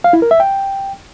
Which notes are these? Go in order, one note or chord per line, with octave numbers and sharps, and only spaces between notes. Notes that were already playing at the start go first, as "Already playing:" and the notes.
F5
E4
A#4
E5
G5